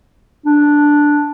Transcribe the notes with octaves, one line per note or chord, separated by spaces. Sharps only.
D4